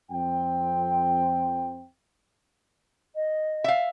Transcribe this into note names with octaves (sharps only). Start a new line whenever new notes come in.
F2 C4 G5
D#5
E5 F5